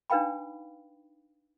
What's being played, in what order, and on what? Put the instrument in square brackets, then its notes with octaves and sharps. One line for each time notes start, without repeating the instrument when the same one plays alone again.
[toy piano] D4 D#4 B4 F5 G5 B5